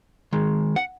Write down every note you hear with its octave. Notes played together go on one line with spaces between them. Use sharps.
D#3 G#3
F#5